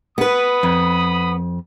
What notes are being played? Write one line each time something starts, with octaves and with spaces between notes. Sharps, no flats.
B3 B4 B5 D#6
F2